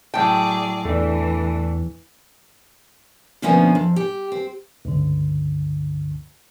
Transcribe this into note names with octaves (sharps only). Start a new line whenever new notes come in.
A2 F#3 G#4 D5 G5 A5
E2 E3 A3 D4
D2 B2 F3 A#3 B3 C#4
F2
G4
C4
C#2 G2 D3